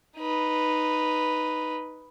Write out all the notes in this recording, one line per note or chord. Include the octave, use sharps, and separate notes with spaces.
D#4 B4